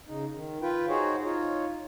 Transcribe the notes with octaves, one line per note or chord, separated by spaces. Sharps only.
C#3 D#4
D#3
F4 B4 G5
D#4 F#4 G#4 C5 C#5
D#4 F4 C#5